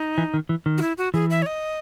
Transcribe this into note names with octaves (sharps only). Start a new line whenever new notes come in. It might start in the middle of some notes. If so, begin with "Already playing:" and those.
Already playing: D#4
E3
D#3
E3
D#3
F#4
E4
F#4
E3 G#4
E5
C#5
D#5